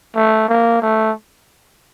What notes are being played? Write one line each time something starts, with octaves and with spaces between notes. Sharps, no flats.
A3
A#3
A3